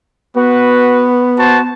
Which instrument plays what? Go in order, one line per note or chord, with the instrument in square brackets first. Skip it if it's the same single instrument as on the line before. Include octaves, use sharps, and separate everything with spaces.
[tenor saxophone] B3 [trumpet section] F#4 B4
[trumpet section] F#4 C5 A5